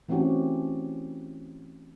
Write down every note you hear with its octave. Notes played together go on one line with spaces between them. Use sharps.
E3 A3 C4 C#4 F#4 G4